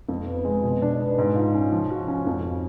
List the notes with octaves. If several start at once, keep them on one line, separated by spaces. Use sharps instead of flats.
F2
B3
G#3
B2
D4
B3
G#2
F4
C#4
F3
F#4
C#4
F2